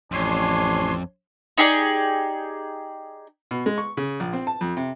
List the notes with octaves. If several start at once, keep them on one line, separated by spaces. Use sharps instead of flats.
A1 F2 D4 C#5 G#5 C6
D#4 G4 G#4 D5
B2
G#3
C#6
C#3
A#1
C4
A5
F2
C3